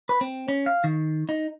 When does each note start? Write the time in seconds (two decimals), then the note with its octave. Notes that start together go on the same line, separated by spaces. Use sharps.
0.09 B4
0.21 C4
0.48 C#4
0.66 F5
0.84 D#3
1.29 D#4